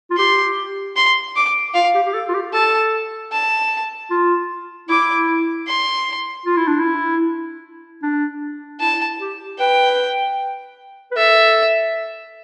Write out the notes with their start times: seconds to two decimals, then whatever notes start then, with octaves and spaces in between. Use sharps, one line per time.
0.11 F4
0.17 G4 C6
0.96 C6
1.36 D6
1.74 F4 F5
1.95 G4
2.06 G4
2.14 A4
2.29 F4
2.34 G4
2.53 A4 A5
3.32 A5
4.11 F4
4.89 E4 D6
5.68 C6
6.46 F4
6.57 E4
6.68 D4
6.79 E4
8.02 D4
8.81 E4 A5
9.20 G4
9.59 B4 G5
11.11 B4
11.17 A4 E5